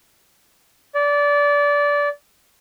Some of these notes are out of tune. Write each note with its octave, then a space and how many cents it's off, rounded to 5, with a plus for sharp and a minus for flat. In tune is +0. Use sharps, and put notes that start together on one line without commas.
D5 -20